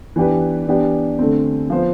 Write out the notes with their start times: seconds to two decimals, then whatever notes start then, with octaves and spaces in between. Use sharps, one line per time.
0.16 E3 B3 D4 G4 B4
0.68 E3 B3 D4 G4
1.19 D3 A3 C4
1.70 F3 B3 F4 C5